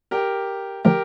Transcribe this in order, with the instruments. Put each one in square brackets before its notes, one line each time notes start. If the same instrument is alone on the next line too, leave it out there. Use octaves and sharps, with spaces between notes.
[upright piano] G4 A#4
[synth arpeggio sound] D3 F3 A3 [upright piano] G4 A#4